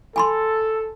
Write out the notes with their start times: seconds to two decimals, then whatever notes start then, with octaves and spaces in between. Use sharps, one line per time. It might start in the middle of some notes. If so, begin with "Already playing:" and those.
0.16 A4 G#5 B5 C6